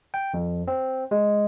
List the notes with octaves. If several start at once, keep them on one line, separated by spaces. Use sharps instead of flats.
G5
F2
C4
G#3